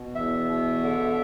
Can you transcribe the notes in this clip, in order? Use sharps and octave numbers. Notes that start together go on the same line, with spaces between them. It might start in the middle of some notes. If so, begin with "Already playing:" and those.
Already playing: B2
E2 E5
B2
D3